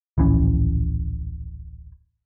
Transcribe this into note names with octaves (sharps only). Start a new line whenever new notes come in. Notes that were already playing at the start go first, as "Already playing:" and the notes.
D1 A#1 E3 C#4